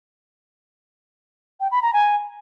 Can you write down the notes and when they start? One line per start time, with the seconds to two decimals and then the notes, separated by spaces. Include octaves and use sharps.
1.60 G5
1.71 B5
1.82 A#5
1.93 G#5